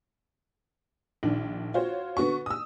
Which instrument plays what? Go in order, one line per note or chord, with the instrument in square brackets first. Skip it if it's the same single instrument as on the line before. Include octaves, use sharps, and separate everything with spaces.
[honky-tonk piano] A#1 D#3 D4
F4 F#4 C5 C#5
D3 B3 F#4 C#6
D#6 E6